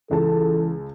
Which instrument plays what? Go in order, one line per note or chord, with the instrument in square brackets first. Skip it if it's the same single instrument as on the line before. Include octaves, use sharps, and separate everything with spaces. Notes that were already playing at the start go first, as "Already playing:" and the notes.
[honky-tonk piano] C#2 A5 [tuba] E3 [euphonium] A4